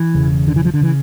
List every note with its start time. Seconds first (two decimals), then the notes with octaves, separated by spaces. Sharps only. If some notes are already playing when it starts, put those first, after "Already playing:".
Already playing: E3
0.14 E1 E2 C#3
0.48 D3
0.56 E3
0.65 F3
0.74 D3
0.81 C#3 E3